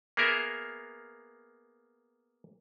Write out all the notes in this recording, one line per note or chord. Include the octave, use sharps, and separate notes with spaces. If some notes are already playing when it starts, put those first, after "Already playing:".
A#3 B3 G#4 A#4 E5